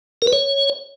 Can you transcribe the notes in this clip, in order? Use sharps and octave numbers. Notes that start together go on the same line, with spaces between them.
A#4
B4
C#5